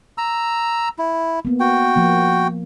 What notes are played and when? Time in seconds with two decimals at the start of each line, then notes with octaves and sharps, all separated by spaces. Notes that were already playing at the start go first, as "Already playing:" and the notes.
0.18 A#5 E6
0.99 E4
1.45 A#3 B3
1.60 F#4 G5
1.96 F3 A#3